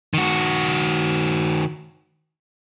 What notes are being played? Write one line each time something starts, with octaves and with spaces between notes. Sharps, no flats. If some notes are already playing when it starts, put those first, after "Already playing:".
D#3 F#4